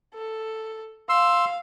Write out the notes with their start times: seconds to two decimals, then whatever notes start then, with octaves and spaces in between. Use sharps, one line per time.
0.15 A4
1.09 F5 C6 E6